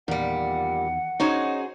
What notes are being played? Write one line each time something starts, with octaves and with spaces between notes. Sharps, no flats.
E2 A#2 D#3 G3 F#5
C#4 D#4 F#4 G#4 C5 C#5